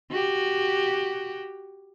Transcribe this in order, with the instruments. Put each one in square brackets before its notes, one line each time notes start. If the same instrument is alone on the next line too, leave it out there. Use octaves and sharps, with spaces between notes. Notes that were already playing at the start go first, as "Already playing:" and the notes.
[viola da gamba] F#4 G4